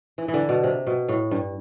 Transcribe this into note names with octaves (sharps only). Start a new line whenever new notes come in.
E3
E3
D3
B2
C3
B2
A2
G2